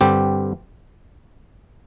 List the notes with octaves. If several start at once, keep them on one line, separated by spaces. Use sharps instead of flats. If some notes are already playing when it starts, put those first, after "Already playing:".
G2 D3 G3 C4 G4